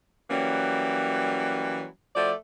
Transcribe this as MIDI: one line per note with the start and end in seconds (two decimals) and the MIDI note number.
0.30 1.86 52
0.30 1.86 54
0.30 1.86 55
0.30 1.86 58
0.30 1.86 61
2.16 2.32 53
2.16 2.32 57
2.16 2.32 66
2.16 2.32 74